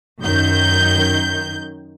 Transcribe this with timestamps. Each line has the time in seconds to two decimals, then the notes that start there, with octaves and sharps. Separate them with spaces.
0.21 F#2 D#3 G6